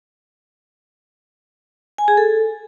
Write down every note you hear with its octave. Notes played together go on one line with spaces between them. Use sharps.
G#5
G#4
A4